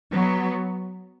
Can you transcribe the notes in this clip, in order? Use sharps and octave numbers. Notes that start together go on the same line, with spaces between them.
F#3 B3